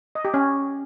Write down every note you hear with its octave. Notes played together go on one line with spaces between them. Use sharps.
D#5
G4
C#4